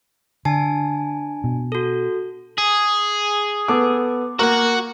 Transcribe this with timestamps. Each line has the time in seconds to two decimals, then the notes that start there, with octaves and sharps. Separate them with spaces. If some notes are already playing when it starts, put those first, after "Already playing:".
0.45 D3 D4 G#5 A5
1.44 B2
1.72 F#4 A4
2.58 G#4
3.68 B3 A4 D6
4.39 A#3 F#4 A#4 F#5